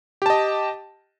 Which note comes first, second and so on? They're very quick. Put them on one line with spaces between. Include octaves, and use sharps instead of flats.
G4 A5 D#5